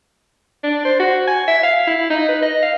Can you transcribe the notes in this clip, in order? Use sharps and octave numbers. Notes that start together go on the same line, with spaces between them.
D4
C5
F#4
G#5
E5
F5
E4
D#4
B4
D#5
F5